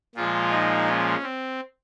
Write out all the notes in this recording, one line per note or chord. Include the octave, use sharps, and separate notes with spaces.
A#2 F3 G#3 F4
D#4
C#4
C4